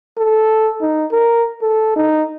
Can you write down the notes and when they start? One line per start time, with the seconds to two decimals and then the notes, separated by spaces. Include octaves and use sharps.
0.18 A4
0.81 D#4
1.11 A#4
1.62 A4
1.96 D#4